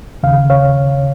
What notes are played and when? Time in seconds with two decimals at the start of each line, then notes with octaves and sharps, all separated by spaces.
0.23 D#2 C#3 F5
0.50 C#5 F5